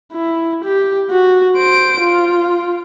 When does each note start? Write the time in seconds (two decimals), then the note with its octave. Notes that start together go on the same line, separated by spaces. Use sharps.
0.13 E4
0.65 G4
1.10 F#4
1.57 C5 D7
2.00 F4